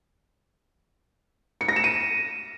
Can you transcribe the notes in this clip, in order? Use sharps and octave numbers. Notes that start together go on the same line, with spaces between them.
C#7
A#6
E7
D#7